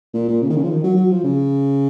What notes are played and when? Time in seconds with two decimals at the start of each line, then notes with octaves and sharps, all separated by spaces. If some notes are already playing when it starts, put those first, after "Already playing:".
0.14 A#2
0.29 A#2
0.42 C#3
0.49 D#3
0.56 C#3
0.63 F3
0.70 D#3
0.84 F#3
0.96 F#3
1.11 F3
1.24 C#3